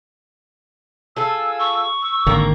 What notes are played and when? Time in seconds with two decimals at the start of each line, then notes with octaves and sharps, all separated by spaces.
1.16 F4 G#4 A4 E6
1.60 C#6
2.02 E6
2.26 G#1 D3 D#3 A#3 A#5